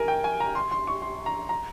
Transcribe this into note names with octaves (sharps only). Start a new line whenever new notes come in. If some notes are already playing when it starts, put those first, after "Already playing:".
Already playing: A#4 G#5
G5
G#5
A#5
C6
C6
C#6
C6
A#5
A#5